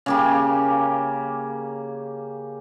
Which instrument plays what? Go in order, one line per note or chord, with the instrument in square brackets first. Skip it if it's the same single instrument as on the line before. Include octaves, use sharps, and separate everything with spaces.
[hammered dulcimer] C#3 A#3 G4